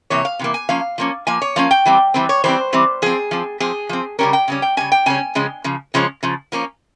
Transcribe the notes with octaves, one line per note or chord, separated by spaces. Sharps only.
C3 E3 A#3 C#5
F5
C3 E3 A#3
G#5
F3 A#3 C#4 F5
F3 A#3 C#4
F3 A#3 G#5
C#5
F3 A#3 C#4 F5
G5
E3 G3 C4
E3 G3 C4
C#5
E3 G3 C4 C5
E3 G3 C4
F3 C4 G#4
F3 C4
F3 C4 G#4
F3 C4
C#3 G3 C#4 A#4
G5
C#3 G3 C#4
G5
C#3 G3 C#4 G#5
G5
C#3 G3 C#4 G#5
C#3 F3 G#3 C#4
C#3 F3
C#3 F3 G#3 C#4
C#3 F3
F3 A#3 C#4